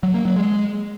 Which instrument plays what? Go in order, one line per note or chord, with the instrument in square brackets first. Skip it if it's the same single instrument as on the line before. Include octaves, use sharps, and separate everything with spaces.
[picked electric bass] F#3
A#3
F#3
G#3